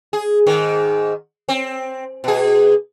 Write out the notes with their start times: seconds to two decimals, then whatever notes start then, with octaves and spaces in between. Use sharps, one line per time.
0.13 G#4
0.46 G#2 D#3
1.49 C4
2.24 B2 G#4